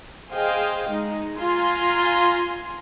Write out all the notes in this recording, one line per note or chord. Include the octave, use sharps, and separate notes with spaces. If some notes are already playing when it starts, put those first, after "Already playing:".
G#4 C5 D#5 F5 G5
G#3 D#4
F4 G#5 A#5 C6